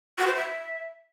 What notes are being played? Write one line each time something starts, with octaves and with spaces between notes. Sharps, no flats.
F#4
C5
E5